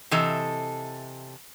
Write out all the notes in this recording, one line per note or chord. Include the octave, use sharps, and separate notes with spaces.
C3 E3 A4 D#5